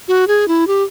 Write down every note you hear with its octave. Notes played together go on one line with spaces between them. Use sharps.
F#4
G#4
E4
G4